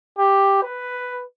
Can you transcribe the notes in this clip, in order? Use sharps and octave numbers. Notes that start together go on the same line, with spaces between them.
G4
B4